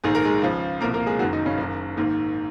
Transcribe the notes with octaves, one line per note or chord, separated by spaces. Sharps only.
A#1 G#2 D#3 G#4
A#4
G#3 G#4
C#2 C#3 F3
C2 A#2 F3 A#3 A#4
A#3 A#4
G#3 G#4
F#1 F#2 D#3 F#3 F#4
D#3 D#4
C#3 C#4
F#1 F#2 D#3
A#1 G#2 D#3 A#3